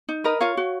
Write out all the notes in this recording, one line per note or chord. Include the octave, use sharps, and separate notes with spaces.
D#4
A#4 B4 D#5
F4 C#5 F5
F#4